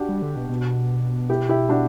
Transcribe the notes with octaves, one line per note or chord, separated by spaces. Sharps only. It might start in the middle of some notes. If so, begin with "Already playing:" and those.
Already playing: D4 F#4 G4
G3
D3
B2
B2
E4 G4
E4 G4
D4 F#4